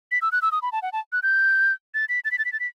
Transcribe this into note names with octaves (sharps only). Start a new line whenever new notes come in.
B6
E6
F#6
E6
D#6
B5
A5
F#5
A5
F#6
G6
A6
B6
A6
B6
A6
B6
A6
B6